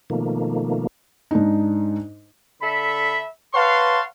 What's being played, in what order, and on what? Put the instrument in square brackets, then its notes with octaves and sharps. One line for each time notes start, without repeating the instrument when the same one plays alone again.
[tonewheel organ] B2 D#3 F3 A3 A#3
[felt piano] G#2 D4 D#4
[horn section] D3 A4 E5 B5
B4 C#5 F5 F#5 A5 C6